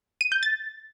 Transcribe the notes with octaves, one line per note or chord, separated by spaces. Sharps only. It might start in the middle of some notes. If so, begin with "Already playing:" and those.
D#7
G6
A6